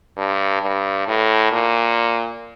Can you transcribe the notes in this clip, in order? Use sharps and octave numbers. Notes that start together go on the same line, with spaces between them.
G2
G2
A2
A#2